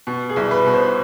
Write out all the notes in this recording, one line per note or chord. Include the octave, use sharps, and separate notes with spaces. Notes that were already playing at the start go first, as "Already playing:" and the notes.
B2
G#4
C2
B4
B2
C5